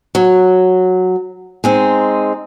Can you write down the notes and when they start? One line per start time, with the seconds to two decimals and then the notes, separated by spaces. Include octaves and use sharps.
0.15 F#3
1.64 G#3 C4 D#4